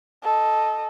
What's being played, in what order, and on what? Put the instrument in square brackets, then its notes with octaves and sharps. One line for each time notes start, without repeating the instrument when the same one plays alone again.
[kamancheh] A4 D#5